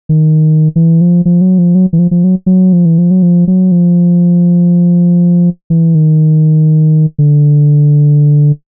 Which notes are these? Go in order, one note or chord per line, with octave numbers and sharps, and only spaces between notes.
D#3
E3
F3
F3
F#3
F3
F#3
E3
F3
F3
F#3
F#3
F3
E3
F3
F#3
F3
F#3
F3
E3
D#3
D3